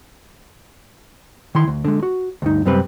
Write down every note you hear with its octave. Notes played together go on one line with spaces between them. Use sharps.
D#3 E4 C6
D2
D3 G#3
F#4
D2 G2 D#4
F#2 C3 G3 C4 B4